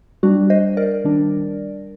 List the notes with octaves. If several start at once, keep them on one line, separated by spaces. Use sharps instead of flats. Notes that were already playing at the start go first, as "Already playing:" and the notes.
G3 D4 F#4
C5 D#5
A#4 D5
D#3 G3 D4